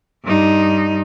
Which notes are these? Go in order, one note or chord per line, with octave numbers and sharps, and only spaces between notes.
G2 D#4